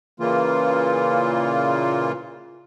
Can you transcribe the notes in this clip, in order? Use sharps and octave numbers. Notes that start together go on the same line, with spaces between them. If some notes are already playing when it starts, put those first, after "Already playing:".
A#2 C#3 E3 A#3 F4